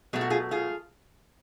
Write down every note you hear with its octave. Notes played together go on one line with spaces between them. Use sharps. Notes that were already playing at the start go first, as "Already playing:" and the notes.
B2 F#3 A3 G#4
F#4
F4 G#4
F4 G#4